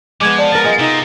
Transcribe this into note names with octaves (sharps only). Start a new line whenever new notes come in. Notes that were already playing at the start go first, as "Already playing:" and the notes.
F3 G#3 B3 D6 G#6
D5 F#5 A5
B3 A#4 A6
F4 G#4 D#5
C3 D#4